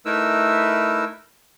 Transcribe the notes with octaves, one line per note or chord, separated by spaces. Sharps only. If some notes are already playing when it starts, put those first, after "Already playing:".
A3 D#4 E4 A#4 B4 E6